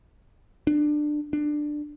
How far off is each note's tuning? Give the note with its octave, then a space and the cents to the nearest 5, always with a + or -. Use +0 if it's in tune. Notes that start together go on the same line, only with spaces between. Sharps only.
D4 +20
D4 +15